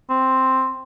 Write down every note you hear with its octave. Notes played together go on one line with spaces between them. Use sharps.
C4